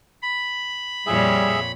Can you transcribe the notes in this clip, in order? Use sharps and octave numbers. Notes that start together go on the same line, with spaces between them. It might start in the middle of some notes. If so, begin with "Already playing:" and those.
B5
F2 A#2 G3 G#4 C#5 E5